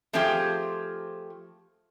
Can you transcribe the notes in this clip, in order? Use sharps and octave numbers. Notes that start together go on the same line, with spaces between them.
F3 A3 C4 F4 G4 G#4